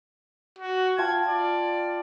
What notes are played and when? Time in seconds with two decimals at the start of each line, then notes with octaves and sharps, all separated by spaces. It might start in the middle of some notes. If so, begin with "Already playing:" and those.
0.59 F#4
0.98 F4 G5 A5 G#6
1.28 D5